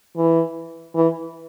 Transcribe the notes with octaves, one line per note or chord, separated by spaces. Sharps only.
E3
E3